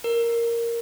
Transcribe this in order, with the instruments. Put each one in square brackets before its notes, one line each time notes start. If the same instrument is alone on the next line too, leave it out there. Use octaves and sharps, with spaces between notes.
[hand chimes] A#4